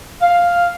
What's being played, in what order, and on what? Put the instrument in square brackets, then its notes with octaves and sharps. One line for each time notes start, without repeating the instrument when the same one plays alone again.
[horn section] F5